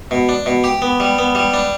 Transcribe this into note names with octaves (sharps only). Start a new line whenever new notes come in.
B2
D4
B2
G4
B3
G3
B3
G3
D4